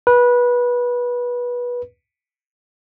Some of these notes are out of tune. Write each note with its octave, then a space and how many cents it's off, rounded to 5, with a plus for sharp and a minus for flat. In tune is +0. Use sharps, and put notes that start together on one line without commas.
B4 -20